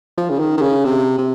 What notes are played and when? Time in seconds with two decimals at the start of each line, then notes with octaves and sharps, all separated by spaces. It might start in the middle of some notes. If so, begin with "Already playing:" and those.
0.18 F3
0.30 C#3
0.40 D#3
0.57 D#3
0.62 C#3
0.85 C3
1.18 C3